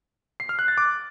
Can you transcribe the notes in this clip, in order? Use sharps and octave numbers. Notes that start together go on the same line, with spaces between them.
C7
F6
F#6
A6
D6